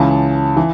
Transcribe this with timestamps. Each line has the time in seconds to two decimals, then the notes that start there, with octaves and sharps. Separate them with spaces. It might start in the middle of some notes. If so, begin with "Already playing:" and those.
Already playing: C#2 C#3 E3 A5
0.57 E3